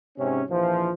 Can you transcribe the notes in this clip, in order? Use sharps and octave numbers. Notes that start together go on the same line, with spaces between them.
G#2 C3 C#4
A#1 E3 F3